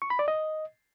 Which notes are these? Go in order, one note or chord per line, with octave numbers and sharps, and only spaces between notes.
C#6
B5
D5
D#5